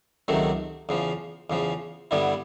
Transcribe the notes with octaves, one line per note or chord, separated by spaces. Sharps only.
C#2 C3 D#3 F#3 A3
E2 C#3 F3
E2 C#3 F3
G2 D3 G3 B3 E4